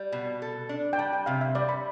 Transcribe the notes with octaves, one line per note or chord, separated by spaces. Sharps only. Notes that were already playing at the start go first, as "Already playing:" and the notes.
Already playing: G3
B2
A4
D4
G5
G3 A5
G5
C3 F5
E5
G3 D5
B5